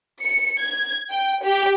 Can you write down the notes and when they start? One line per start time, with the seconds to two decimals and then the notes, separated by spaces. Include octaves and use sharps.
0.24 C#7
0.61 G#6
1.11 G5
1.44 G4